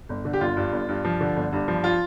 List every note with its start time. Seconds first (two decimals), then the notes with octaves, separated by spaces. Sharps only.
0.09 G1
0.25 D3
0.33 G4
0.41 G1 F4
0.57 G2
0.72 G1
0.88 G2
1.05 F3
1.21 D3
1.36 G1
1.52 G2
1.68 F3
1.84 F4